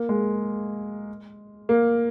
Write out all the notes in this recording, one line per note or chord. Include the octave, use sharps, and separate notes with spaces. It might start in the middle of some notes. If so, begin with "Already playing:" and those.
Already playing: A#3
G#3
A#3